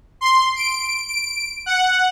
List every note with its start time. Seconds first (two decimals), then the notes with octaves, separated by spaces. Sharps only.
0.21 C6
0.56 D7
1.08 D7
1.66 F#5